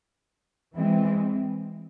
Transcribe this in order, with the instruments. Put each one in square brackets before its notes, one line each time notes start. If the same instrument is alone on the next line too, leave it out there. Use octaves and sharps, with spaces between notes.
[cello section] E3 G#3 C4